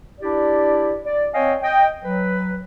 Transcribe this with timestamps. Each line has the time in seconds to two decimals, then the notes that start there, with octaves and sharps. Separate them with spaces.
0.21 D4 E4 G4 D5
1.05 D5
1.34 C4 C#5 D#5 F5 G5 G#5
1.63 D#5 G5
2.04 F#3 B4